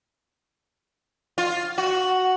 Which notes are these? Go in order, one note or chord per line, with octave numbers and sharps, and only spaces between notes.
F4
F#4